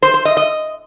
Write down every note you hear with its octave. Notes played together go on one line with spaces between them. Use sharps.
C5
C5
D#5
D#5